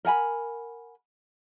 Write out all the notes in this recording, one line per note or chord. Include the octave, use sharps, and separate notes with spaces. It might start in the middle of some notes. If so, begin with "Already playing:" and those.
A#4 F#5 G#5 B5